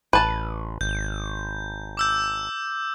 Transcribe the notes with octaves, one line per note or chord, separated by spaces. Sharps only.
A1 B4 A5
G#1 G6
D6 E6 G6